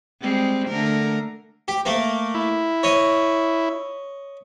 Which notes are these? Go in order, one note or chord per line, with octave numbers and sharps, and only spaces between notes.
G3 G#3 C4
D3 A3 A#4
G4
A3 A#3 A#4
E4
C#5 D#5 D#6